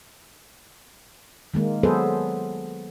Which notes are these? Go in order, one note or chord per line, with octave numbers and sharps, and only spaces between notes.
D#3 G#3 A#3
F#3 B3 G#4 A4 B4 C5